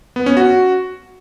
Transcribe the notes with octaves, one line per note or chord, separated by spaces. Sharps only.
B3
C#4
F#4